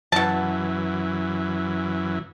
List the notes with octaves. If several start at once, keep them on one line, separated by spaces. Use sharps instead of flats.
F#2 B2 E3 A5